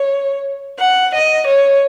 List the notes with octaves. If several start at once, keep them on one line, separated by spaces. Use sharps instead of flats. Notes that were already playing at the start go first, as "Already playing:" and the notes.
Already playing: C#5
F#5
D#5
C#5